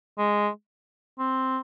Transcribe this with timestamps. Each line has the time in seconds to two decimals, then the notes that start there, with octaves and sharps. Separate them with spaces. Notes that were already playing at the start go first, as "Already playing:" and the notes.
0.18 G#3
1.19 C4